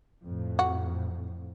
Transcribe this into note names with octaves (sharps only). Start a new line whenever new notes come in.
F2 A2
F#4